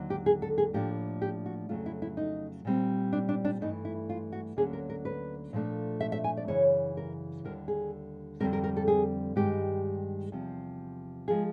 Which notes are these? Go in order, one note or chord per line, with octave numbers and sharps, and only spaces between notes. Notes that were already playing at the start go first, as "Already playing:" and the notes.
Already playing: D#2 D3 F#3 A#3
G4
G#4
A4
G#4
A2 F3 A#3 D4 G4
G4
F#4
F2 C#3 F#3 A3 F4
E4
E4
D#4
A#2 G3 C4
D4
D4
D4
G2 E3 A3 D#4
E4
F4
F#4
D2 D3 F#3 A#3 C#4 G#4
A#4
A#4
B4
A#2 F3 A3 D4
E5
E5
G#5
D5
F#2 C#3 E3 C#5
A#4
D#2 D3 G3 A#4
G#4
F2 D3 G3 C4 A#4
A#4
A#4
A4
G#4
G2 D#3 G#3 B3 G4
E2 C3 F3
F3 G#3 G#4